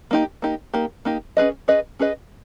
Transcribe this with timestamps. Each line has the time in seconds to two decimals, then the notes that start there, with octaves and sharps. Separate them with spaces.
0.11 A#3 D#4 G4
0.42 A#3 D#4 G4
0.74 A#3 D#4 G4
1.05 A#3 D#4 G4
1.37 C#4 G#4 B4 D#5
1.68 C#4 G#4 B4 D#5
1.99 C#4 G#4 B4 D#5